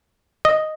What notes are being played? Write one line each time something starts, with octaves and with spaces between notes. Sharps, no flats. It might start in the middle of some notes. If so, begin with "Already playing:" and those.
D#5